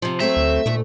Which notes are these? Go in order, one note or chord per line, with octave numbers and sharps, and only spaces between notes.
C3 F3
F#3 A3 C4 E5
D2
D2 A#2 A3